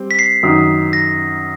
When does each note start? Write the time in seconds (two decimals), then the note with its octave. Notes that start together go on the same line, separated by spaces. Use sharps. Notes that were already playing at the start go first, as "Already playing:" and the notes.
Already playing: G3 C4
0.11 B6
0.19 C7
0.43 F#2 D#3 F#3
0.93 A#6